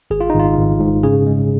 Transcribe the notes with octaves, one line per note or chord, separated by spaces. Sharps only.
G#1 G#4
F4
G#1 D#4
F4
G#1
G#2
C#3 G#4
G#3